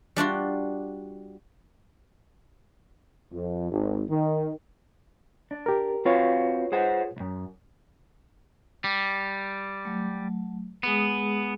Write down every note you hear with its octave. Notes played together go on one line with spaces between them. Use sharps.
G3 D4 F4 F#4
F2
G#1
D#3
D4
G4 A#4
C4 F4 F#4 B4 C#5 F5
G#4 C5 F#5
B1 F#2
G3
F#3 A3
G#3 B3 G#4 D#6